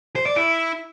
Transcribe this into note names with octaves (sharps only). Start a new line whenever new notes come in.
C5
D5
E4